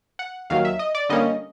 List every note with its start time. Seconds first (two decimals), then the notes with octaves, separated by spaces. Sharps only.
0.19 F#5
0.50 D#2 D#3 F#3 F5
0.65 E5
0.79 D#5
0.95 D5
1.09 D3 G3 A#3 C#4 D#5